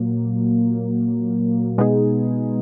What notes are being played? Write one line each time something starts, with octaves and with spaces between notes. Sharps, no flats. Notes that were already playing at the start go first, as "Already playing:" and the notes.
Already playing: A#2 F#3 A#3
B2 G#3 B3 D#4 G#4